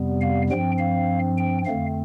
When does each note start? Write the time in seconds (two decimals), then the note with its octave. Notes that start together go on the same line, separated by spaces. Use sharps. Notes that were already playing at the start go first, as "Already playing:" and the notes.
Already playing: F2 C3 G3 B3
0.21 F5
0.50 G2 F3 C4 G5
0.79 F5
1.38 G5
1.65 F2 D3 A3 C4 F5